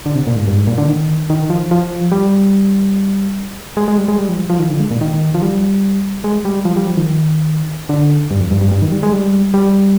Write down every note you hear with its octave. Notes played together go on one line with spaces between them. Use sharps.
D3
C3
A#2
G#2
G2
G#2
A#2
D3
D#3
D#3
F3
F3
G3
G#3
G#3
G3
G#3
G3
F3
F3
D#3
D3
G#3
A#2
D#3
F3
G3
G#3
G3
F3
G3
F3
D#3
D3
G2
F2
G2
G2
G2
D#3
G3
G#3
G3
G3